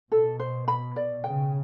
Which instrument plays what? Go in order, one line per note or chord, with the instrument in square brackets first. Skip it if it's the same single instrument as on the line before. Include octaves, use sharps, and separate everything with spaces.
[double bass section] B2 [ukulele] A4
[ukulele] C5
B5
D5
[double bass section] C#3 [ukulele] G5